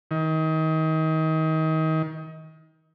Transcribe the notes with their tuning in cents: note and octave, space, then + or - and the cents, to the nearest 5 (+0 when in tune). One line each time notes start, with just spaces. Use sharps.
D#3 +30